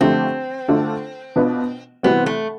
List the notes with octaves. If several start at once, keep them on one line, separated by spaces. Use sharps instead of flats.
D3 F3 A3 C4 D4 G4
D3 A3 D4 F4 A4
B2 B3 D4 F4 B4
C3 E3 G3 B3 C4
A3